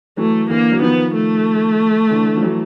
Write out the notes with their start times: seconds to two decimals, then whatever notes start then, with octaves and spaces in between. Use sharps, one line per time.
0.17 E3 F#3 A3
0.50 D3 E3 A#3
0.72 F#3
0.82 D#3 F3 B3
1.14 A3
2.10 D3 E3
2.36 F3
2.42 E3 F#3